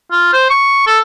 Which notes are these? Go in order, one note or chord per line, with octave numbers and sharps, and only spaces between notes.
F4
C5
C#6
A4